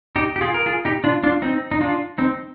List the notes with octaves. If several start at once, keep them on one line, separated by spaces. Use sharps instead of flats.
D#4 G4
G4
F4 G#4
A#4
F4 G#4
D#4 G4
D4 F4
D4 F4
C4 D#4
D#4
D4 F4
C4 D#4